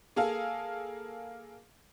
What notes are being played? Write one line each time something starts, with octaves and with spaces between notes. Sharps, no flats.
A#3 G#4 A4 F5